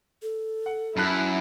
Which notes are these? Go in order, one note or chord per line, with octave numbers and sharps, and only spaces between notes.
A4
F#5
F#2 E4 A5 B5 F#6